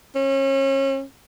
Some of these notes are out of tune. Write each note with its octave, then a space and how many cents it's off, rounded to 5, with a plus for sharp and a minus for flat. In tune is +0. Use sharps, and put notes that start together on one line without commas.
C#4 -35